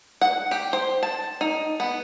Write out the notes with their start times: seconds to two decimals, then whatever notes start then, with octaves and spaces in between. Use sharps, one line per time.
0.21 F#5
0.51 G4
0.73 C5
1.03 A5
1.41 D#4
1.80 B3